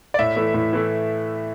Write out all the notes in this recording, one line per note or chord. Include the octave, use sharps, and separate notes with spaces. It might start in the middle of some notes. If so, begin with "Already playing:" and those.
D5
A2 E5
E3 A3
A2
E3 A3